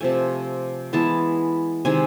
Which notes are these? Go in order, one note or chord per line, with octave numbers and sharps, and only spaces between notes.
C3 F3 A3 G#5
E3 G#3 B3 A5
C3 D#3 G#3 G#5